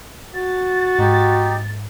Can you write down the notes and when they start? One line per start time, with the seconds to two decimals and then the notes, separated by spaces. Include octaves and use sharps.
0.34 F#4 A6
0.99 G#2 D#4 G4